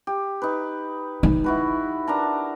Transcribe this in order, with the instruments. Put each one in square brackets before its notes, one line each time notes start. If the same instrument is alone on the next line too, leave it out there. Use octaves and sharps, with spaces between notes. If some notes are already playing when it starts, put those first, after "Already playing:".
[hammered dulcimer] G4
D#4 B4
[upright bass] D#4
[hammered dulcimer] E4 F#4 B4
D4 A#4 A#5